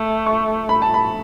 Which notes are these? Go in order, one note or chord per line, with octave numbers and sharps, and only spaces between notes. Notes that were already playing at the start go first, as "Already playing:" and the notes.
Already playing: A3
C#6
B5
A5
B5